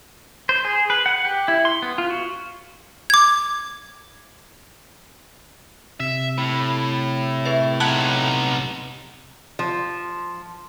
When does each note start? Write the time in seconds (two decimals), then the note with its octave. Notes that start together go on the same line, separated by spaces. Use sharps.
0.49 C5
0.65 G#4
0.90 B4
1.06 F#5
1.25 G4
1.48 E4
1.65 C6
1.82 B3
1.98 F4
2.10 F#4
3.10 D6 G#6
6.00 C3 E5
6.38 A2 B5
7.45 G#4 B4 E5
7.80 B3 D#4 A5 F#6 G#6
9.59 F3